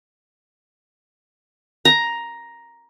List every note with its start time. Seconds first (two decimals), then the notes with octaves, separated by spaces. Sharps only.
1.85 A#5